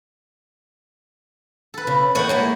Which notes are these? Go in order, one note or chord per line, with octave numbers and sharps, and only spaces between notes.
A4 B4
C#3
A2 E3 C#5 F#5 G5
G#3 A#3 E4